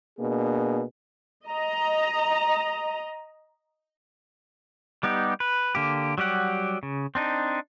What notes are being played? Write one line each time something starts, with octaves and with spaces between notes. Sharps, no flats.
B2 A#3 D4 G#4
D#5 A#5
G3 B3 D#4 G4
B4
D3 A#3 G4
F#3 G3 G4 F#5
C#3
C4 D4 D#4